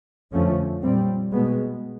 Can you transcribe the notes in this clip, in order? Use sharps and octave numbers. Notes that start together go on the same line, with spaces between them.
F2 D3 F3 A3 C#4
A#2 G3 C4
B2 G#3 B3